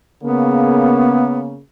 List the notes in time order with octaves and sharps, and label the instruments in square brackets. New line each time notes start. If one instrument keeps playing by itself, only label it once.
[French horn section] C#3 A#3 [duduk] B3